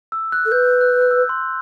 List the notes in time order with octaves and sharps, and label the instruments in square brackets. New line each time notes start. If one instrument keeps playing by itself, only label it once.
[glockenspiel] E6
F#6
[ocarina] A4
[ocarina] B4 [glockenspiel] G6
[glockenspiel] F#6
F#6
E6
C6